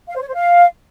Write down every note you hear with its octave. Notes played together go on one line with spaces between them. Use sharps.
F5
C5
C#5
C5
F5